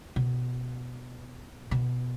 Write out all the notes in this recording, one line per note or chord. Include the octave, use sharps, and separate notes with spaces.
B2
B2